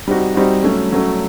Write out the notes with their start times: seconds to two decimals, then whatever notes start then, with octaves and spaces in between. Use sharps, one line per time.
0.08 G3 C4 D#4 F#4
0.35 G3 C4 D#4 F#4
0.63 F#3 A3 C#4
0.92 F#3 A3 C#4